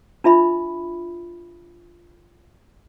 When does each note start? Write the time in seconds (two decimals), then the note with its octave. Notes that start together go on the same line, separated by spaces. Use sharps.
0.24 D4 F4 E5 B5